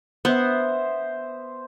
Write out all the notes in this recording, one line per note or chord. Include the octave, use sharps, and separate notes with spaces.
B3 C5 E5